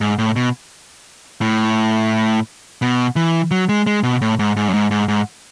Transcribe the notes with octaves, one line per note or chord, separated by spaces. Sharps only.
G#2
A2
B2
A2
B2
E3
F#3
G#3
G#3
B2
A2
G#2
G#2
F#2
G#2
G#2
G#2